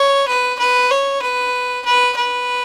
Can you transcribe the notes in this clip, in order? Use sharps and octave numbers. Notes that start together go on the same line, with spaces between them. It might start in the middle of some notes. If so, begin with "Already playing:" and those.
Already playing: C#5
B4
B4
C#5
B4
B4
B4